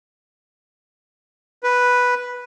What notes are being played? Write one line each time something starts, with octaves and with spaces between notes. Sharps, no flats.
B4